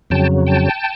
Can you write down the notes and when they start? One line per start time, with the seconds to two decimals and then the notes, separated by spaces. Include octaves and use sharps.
0.10 F2 C#3 F#3 G5 A5
0.47 G5 A5